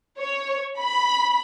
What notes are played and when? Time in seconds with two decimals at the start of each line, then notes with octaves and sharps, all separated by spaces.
0.20 C#5
0.79 B5